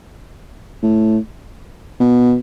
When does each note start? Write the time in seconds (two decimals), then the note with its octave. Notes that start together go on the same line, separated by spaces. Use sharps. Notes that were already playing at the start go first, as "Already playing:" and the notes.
0.83 A2
2.00 B2